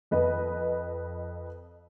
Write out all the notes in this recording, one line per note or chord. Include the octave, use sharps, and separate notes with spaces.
F2 B4 D#5